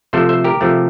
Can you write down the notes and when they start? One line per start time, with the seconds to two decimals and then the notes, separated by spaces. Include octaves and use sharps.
0.13 C3 F3 A3 A4 C5
0.29 C5 E5
0.44 G4 A#4
0.61 C3 F3 A3